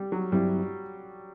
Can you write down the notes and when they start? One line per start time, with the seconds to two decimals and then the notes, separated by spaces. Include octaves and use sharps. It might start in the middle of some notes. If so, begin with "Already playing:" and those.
Already playing: G3
0.12 F#3
0.32 G2 F#3 G3 C4 E4